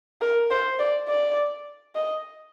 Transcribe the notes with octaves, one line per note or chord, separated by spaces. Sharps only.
A#4
C5
D5
D5
D#5